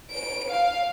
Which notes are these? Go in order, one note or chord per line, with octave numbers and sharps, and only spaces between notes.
D7
F5